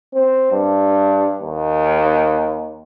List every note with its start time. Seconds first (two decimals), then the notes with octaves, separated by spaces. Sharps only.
0.14 C4
0.52 G2
1.41 D#2